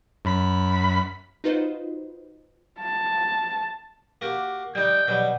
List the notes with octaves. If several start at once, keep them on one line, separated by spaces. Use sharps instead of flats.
F#2 B5 B6
D#4 F4 F#4 B4 C5 D#5
A5
A#3 F#4 G4
G3 D#4 G5
B2 F#3 G3